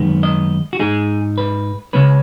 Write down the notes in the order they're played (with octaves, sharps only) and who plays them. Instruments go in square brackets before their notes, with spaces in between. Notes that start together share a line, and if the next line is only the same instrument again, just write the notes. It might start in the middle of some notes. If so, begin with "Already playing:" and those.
Already playing: [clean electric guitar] F#2 D#3 G#3 B3 D#4
D#5
F#4
G#2 G#3 D#4 G#4
B4
C#2 C#3 G#3 C#4 B4